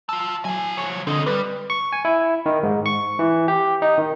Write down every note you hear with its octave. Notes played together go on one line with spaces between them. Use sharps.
F4 A5 E6
F#3 A4 G#5
F3 C#5
D3 C4 D#5
G3 B4
C#6
G#5
E4
D#3
G#2
C#6
E3
G4
D#4
D#3